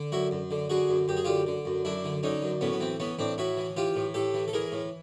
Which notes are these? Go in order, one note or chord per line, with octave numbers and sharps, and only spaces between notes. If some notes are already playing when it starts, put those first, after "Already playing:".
Already playing: D3
F#2 E4 F#4
F#2
D3
D3 F#4 G#4
F#2
F#2 G4
G#4
D3 F4 G4
D3
F#2
F#2 D4 E4
D3
D3 C#4 D#4
F#2
A2 B3 C#4
B3
E3 C4
E3 B3 C#4
A2 C4 D4
A2 E4 F#4
E3
E3 F4 G4
A2
A2 G4 A4
E3
A4
E3 G#4 A#4
A2